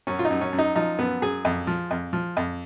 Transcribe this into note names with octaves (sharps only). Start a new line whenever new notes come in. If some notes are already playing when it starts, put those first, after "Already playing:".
F#2 C#4
F4
D#4
F#2
C#4
F#2
D#4
F3 D#4
F#2 B3
F#2 G#4
F2
F3
F2
F3
F2